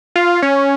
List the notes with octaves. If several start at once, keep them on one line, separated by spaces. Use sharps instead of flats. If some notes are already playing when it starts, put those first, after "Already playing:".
F4
C#4